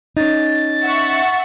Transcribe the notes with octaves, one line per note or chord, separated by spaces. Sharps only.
C#4 D#4 A6
E5 F#5 C#6